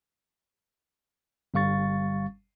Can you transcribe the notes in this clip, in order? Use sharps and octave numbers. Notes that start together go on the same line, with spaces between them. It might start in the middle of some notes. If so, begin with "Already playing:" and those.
G1 G3 F5 C#6 A6